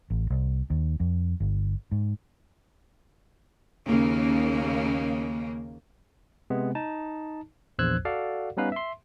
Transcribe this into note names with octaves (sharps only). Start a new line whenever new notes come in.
A1
C2
D#2
F2
G1
G#2
D#2 C#3 A#3
C3 G#3 B3
D#4 A5
A#1 E2 C5 E6 F#6 G#6
F#4 A4 D5 F5 F#5
G3 B3 C#4 D#4 B4 F5
E5 C6